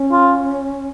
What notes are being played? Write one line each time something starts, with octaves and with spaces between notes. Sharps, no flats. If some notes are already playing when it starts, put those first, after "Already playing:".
Already playing: C#4
F4